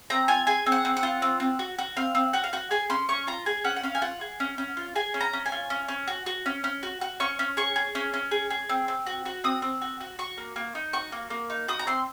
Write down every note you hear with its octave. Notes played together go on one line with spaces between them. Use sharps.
C4 A#5
F4 G#5
G#4 G#5
C4
F#5
C4
F#5
F4
C4
C4
F#4
F#4
C4 F5
C4
F#4 F#5
F5
F#4 F#5
G#4 G#5
C#4 C6
C#4 C#6
F4 A#5
G#4 G#5
C#4 F#5
F#5
C#4 F5
G#5
F4 F#5
G#4
C#4
C#4
F4
G#4 G#5
C#4
A#5
C#4
G#5
F4
C#4
C#4
F#4
F#4
C#4
C#4
F#4
F#4
C#4 C#6
C#4
G#4 C#6
G#4
C#4
C#4
G#4
G#4
C4
C4
F#4
F#4
C4 D#6
C4
F#4
F#4
F#4 C#6
A#3
A#3
D#4
F#4 C#6
A#3
A#3
D#4
F#4 D#6
A#5
C4 C6